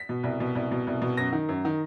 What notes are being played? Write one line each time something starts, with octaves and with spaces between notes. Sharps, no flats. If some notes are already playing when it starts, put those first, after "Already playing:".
Already playing: B6
B2
C2
B2
C2
B2
C2
B2
F#2 A#6
D#3
F#2
D#3